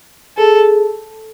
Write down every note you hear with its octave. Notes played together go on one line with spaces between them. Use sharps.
G#4 A4